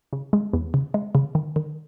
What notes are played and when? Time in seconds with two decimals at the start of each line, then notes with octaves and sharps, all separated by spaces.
0.13 C#3
0.33 G#3
0.53 E2
0.74 C#3
0.94 G#3
1.15 C#3
1.35 D#3
1.56 D#3